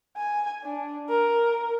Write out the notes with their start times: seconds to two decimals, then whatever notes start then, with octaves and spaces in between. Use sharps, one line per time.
0.17 G#5
0.63 D4
1.10 A#4